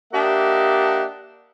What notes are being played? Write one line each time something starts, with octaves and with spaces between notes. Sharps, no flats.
A#3 D4 G4 D#5 E5 F#5